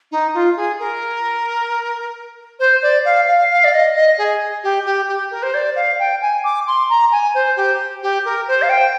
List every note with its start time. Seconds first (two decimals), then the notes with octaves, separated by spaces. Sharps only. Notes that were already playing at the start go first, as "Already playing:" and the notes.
0.11 D#4
0.33 F4
0.56 G#4
0.79 A#4
2.59 C5
2.82 D5
3.05 F5
3.27 F5
3.50 F5
3.64 D5
3.73 D#5
3.95 D#5
4.18 G#4
4.63 G4
4.85 G4
5.08 G4
5.30 A#4
5.42 C5
5.54 D5
5.75 F5
5.99 G5
6.21 G#5
6.43 D6
6.67 C6
6.89 A#5
7.11 G#5
7.34 C5
7.56 G4
8.02 G4
8.24 A#4
8.47 C5
8.61 F5
8.69 G5